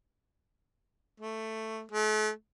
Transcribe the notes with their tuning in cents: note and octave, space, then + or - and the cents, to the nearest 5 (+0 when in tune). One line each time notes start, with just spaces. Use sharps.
A3 +5
A3 -40